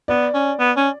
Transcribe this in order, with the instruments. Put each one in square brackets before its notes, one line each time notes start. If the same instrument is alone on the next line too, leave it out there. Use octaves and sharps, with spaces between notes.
[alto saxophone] B3 [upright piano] D5
[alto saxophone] C#4
B3
C#4